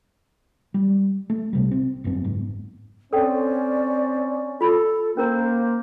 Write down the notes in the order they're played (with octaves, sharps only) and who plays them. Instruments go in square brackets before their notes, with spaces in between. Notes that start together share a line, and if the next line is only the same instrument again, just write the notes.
[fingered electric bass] G3
A3
B1 C3 G3
C4
G1 F#2 B3 C4
F#1 G#2
[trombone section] C4 C#4 [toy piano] A4 G5 A5 [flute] D5
[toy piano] F4 B5 [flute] A4
[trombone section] A#3 [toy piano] C#4 A#4 A#5 [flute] C5